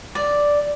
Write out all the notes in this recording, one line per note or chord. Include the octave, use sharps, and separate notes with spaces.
D5